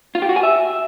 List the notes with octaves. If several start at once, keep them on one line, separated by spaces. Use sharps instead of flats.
F4
G4
F#4
G#5
E5